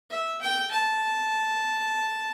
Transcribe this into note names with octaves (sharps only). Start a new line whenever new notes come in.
E5
G5
A5